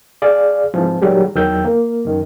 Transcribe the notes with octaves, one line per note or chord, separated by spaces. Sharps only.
G#4 D5 F5
G#2 E3 F3 C4
A#2 D#3 F#3 G3 G4 G#4
E2 D#3 F#3 G5 E6 G6
A#3
F#2 D#3